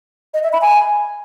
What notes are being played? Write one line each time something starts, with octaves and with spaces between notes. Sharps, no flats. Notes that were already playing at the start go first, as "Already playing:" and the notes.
D#5
E5
B5
G#5